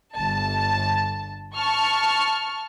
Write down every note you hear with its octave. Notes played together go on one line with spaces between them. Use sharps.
G1 A5
A5 C#6 F6